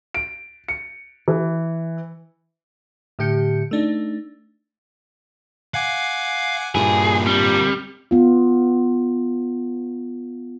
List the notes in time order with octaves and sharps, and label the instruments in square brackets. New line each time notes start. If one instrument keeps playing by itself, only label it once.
[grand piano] D7
C#7
E3
[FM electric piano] A2 D3 G4 G6 C#7
A3 D4 D#4
[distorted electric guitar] F5 [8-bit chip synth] F#5 G#5 D6
[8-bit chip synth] G2 A#2 [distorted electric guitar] A#3 E4 [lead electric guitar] G#4
[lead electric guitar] G3 [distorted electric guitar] C4 A#4
[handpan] B3 F4